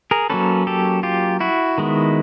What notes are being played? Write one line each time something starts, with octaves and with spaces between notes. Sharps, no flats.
G#4 A#4
F#3 A#3 C#4 A4 B4
G4 A4
F4 G4
E4 F#4
D#3 G#3 B3